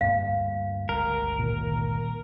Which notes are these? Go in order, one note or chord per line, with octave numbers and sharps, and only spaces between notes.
D2 G2 A#3 F5
G1 C#2 G3 A#4
A#2 D#3